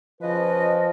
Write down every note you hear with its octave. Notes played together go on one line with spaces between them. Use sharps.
C#3 F3 B4 D#5